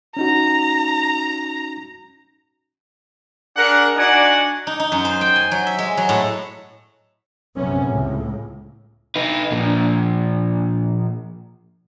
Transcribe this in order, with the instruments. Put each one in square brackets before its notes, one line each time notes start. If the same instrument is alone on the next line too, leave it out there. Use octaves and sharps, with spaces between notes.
[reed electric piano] C#4 D#4 F#4 [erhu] A#5
[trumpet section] D4 G#4 A#4 F#5
D4 D#4 F#4 D5 F#5 G#5
[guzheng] D#4
D#4
F#2
C5
G5
G#5
F#3
E5
G#3
F#3
A2
[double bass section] A#1 F#2 C3 B3 C#4
C#2 A2
[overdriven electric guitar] D#4 B4
A#2 F3